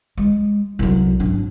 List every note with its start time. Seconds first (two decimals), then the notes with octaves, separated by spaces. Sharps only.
0.18 G#3
0.79 C2 F#3
1.20 G#1 D4